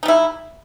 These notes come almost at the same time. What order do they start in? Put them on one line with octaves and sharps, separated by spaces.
D#4 G3 E4